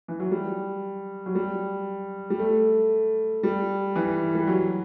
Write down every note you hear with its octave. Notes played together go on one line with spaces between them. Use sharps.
E3
F#3
G3
F#3
G3
G3
A3
G3
E3
G3
F#3